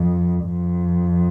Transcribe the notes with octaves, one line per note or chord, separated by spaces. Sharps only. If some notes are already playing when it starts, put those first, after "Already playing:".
Already playing: F2
F2